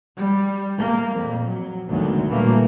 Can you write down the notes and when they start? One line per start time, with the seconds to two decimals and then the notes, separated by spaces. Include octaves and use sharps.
0.17 G3
0.80 A#3
1.17 F2 A#2
1.48 F#3
1.88 G#1 D2 B2 D3 D#3 F#3
2.29 A#2 E3 G3 A3 A#3